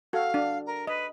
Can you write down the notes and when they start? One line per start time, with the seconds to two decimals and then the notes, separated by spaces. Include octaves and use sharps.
0.13 F#4 A4 F5
0.34 D4
0.66 A#4
0.87 B4 D#5